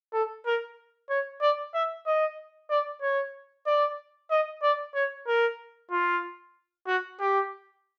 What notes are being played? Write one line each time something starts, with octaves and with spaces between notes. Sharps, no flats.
A4
A#4
C#5
D5
E5
D#5
D5
C#5
D5
D#5
D5
C#5
A#4
F4
F#4
G4